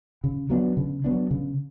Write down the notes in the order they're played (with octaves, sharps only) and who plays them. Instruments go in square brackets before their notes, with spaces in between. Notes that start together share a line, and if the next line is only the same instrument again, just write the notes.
[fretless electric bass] C#3
F#3 B3 D4
C#3
F#3 B3 D4
C#3